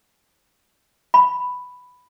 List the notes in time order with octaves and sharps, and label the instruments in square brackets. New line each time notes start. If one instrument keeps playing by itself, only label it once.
[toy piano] B5